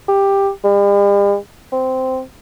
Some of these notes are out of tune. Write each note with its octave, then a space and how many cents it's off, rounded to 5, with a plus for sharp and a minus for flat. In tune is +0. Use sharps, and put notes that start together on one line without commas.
G4 +10
G3 +45
C4 -10